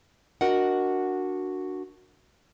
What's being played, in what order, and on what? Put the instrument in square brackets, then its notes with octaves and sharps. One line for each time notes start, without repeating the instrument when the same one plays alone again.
[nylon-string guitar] D4 F#4 A#4 D#5 F#5